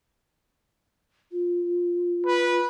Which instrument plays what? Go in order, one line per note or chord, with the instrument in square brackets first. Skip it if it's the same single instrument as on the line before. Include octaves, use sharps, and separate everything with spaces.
[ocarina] F4
[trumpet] B4